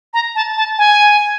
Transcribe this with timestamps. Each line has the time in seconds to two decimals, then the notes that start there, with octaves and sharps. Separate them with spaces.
0.14 A#5
0.35 A5
0.57 A5
0.78 G#5